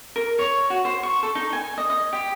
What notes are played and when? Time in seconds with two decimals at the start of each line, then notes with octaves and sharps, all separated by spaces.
0.16 A#4
0.39 C#5
0.70 F#4
0.85 C5
1.03 C#6
1.23 A4
1.35 D#4
1.53 G#5
1.78 D#5
1.90 D#5
2.13 G4